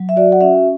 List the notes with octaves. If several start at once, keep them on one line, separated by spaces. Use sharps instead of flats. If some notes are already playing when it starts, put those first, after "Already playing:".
Already playing: F#3
E5
F#4 D5
F#5
C#4 E5